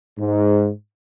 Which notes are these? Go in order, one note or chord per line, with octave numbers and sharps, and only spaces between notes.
G#2